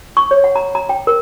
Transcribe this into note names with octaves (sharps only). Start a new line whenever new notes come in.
C#6
C#5
F#5
A#5
A#5
G5
A#4